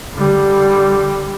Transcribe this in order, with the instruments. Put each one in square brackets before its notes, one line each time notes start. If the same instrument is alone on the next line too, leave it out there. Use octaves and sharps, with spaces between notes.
[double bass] D3 G3